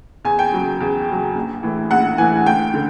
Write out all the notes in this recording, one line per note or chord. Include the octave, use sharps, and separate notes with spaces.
E2 G#5
G5
C#3 F#3
E2
C#3 F#3
A#1
A2 E3
A#1 F#5
A2 E3 G#5
D2 G5
D3